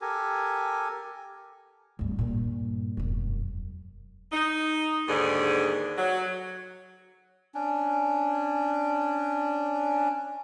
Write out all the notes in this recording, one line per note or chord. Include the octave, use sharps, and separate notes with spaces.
G4 A4 A#4 G#5
D1 G2
G2 A#2
E1 F#2
D#4
D#2 G#2 D3 G#4
F#3
C#4 D4